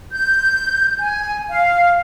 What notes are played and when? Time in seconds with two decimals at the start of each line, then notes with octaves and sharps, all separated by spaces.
0.12 G6
0.99 G#5
1.50 F5